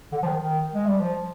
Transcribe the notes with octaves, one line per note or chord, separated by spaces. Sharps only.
D3
F3
D#3
D#3
G#3
G3
F3